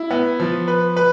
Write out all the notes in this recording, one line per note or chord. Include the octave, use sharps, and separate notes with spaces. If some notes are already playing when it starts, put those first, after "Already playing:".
Already playing: E4
B3
F3
B4
B4